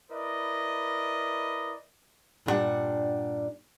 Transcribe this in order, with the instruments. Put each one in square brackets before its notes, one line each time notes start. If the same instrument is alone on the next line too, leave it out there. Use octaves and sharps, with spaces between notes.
[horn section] E4 A#4 B4 D5 D#5
[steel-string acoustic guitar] G2 A#2 E3 G3 D4 F#5